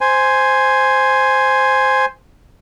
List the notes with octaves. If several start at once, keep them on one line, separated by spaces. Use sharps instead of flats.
C5 G#5